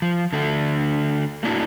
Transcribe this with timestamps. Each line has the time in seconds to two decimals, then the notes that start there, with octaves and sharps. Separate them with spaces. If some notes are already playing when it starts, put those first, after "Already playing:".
0.02 F3
0.33 D3 A3 D4
1.43 A3 A#3 D4 E4 F#4